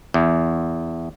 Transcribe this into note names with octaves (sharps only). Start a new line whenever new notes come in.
E2